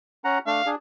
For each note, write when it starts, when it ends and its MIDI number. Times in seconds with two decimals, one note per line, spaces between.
0.25 0.38 61
0.25 0.38 78
0.25 0.38 82
0.47 0.62 57
0.47 0.62 62
0.47 0.69 77
0.66 0.75 62
0.66 0.75 68